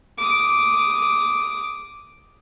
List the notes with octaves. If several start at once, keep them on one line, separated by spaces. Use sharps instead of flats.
D6 D#6